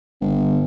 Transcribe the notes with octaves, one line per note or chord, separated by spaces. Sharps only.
G1